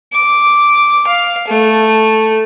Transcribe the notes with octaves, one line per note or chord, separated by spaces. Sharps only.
D6
F5
A3